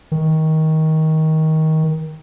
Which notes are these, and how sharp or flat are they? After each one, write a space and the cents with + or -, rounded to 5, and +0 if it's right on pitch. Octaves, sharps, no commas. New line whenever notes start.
D#3 +20